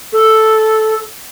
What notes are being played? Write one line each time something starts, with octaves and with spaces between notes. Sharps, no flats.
A4